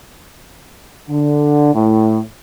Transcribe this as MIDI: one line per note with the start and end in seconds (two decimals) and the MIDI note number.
1.09 1.71 50
1.74 2.19 45